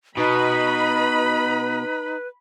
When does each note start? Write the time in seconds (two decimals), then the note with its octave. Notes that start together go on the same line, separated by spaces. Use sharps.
0.17 B2 D#4 B4 B5